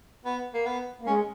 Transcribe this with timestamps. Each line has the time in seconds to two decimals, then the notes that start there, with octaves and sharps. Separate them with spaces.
0.25 B3
0.54 A#3
0.66 B3
1.01 A#3
1.07 G#3 C#4